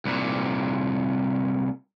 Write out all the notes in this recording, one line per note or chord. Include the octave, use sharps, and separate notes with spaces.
C2 A#2